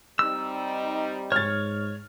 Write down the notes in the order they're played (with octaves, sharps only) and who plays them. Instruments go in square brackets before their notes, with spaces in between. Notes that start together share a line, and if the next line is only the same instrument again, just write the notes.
[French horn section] G3 C4 D#4 [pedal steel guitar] E6
[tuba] G#2 [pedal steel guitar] C#5 [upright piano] F6 A6